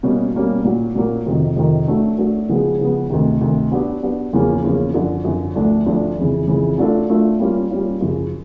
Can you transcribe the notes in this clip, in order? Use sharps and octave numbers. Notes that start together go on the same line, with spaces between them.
B2 G3 A#3 C#4
B2 G3 A#3 C#4
A#2 F#3 A#3
A#2 F#3 A#3
F2 C3 D#3
F2 C3 D#3
F#3 A3 D4
F#3 A3 D4
C#3 F3 G#3 B3
C#3 F3 G#3 B3
D2 C3 D#3
D2 C3 D#3
F#3 B3 D4 G4
F#3 B3 D4 G4
E2 C#3 F3 A#3 C#4
E2 C#3 F3 A#3 C#4
F#2 D3 F3
F#2 D3 F3
D2 D3 F3 A3 D4
D2 D3 F3 A3 D4
F2 C#3 E3
F2 C#3 E3
F#3 A3 D4 F4 A4
F#3 A3 D4 F4 A4
G3 A#3 C#4 F4
G3 A#3 C#4 F4
F#2 C#3 F3